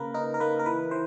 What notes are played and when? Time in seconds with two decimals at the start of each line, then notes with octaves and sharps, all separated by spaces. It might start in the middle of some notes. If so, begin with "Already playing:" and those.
Already playing: C#3 A#3 A#4 B4
0.14 D#4 A#4
0.34 A#4
0.40 A#3 B4
0.59 A#4
0.66 E3 B4
0.91 E3 C5